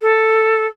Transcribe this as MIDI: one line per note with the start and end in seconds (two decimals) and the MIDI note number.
0.01 0.67 69